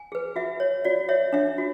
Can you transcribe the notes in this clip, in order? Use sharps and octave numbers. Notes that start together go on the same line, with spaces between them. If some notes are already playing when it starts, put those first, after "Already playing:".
Already playing: G#5
G#4 B4
F#4 E5
C#5
F#4 D5
C#5 E5
D4 E5
F#4